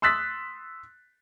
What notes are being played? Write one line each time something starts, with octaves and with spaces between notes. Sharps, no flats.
C6 D#6 E6 F#6 A6 B6